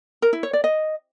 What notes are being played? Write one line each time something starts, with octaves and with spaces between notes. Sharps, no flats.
A#4
E4
C#5
D5
D#5